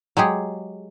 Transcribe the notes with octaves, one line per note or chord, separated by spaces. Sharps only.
F#3 G#3 G4 G#4